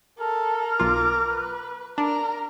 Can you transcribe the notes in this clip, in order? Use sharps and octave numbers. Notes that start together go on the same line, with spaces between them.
A4 A#4
B1 F4 D6
B4
D4 A#4